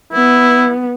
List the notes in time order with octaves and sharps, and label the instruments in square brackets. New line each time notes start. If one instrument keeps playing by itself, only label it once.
[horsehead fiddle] B3 [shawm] E4